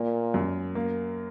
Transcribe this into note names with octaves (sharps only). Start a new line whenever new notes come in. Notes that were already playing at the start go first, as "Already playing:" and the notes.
Already playing: A#2 A#3
F#2
A#3